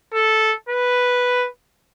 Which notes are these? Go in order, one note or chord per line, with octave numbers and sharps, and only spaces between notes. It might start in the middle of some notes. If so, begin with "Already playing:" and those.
A4
B4